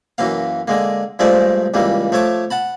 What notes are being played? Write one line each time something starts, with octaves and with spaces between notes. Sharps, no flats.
F#2 E3 A#3 F5
D3 G#3 A#3
G2 F3 G#3 A3 C5 D5
C#2 E3 G3 A#3
F3 A3 C#5 A5 D6
F#5 A5 B5